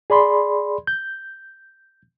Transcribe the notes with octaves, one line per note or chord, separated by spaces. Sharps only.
G#4 D5 B5 C6
G6